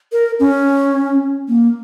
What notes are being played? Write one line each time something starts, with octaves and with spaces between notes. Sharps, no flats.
A#4
C#4
A#3